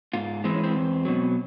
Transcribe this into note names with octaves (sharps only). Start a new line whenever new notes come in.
G#2 F4
E3 G#3 C4
C#4
C4
E2
B2 F#3